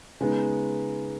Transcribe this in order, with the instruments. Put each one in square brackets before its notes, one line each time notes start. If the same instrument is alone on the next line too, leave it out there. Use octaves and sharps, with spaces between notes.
[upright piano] C#3 G#3 B3 D#4